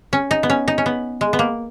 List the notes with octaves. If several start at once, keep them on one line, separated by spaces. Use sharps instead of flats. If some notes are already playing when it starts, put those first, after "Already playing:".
C#4
D#4
B3
C#4
D#4
C#4
B3
G#3
B3
A#3